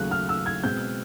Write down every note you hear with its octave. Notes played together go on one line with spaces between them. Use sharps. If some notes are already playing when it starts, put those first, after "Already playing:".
Already playing: D#2 C#3 F#3 A3 F#6
F6
E6
G#6
B2 G#3 C4 G6